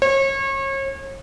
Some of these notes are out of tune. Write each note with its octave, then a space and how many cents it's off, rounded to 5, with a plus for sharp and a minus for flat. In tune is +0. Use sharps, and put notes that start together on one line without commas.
C#5 -35